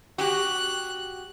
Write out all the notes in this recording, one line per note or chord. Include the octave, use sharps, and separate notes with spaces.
F#4 G4 F#6